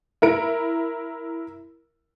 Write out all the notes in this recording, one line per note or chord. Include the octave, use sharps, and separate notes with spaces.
E4 A#4 D7